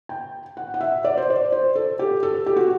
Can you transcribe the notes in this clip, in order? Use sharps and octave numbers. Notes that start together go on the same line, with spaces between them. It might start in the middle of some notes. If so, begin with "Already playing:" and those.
G5
F#5
F#5
E5
D5
C5
D5
C5
A4
G4
A4
G4
F#4